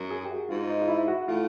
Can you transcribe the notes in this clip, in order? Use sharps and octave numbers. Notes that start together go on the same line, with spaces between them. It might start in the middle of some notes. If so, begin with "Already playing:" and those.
Already playing: F#2
G#4
G4
F#4
G#2 F4
D#4
F4
E4
F#4
A2 F4